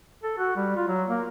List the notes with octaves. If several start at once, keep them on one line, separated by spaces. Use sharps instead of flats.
A4
F#4
G3
F4
F#3
A#3